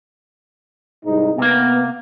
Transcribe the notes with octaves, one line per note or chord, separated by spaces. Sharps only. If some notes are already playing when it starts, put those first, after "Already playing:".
C2 G#2 D#4
C3 A#3 B3